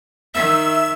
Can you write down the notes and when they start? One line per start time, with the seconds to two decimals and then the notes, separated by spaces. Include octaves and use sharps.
0.34 D#3 E5 E6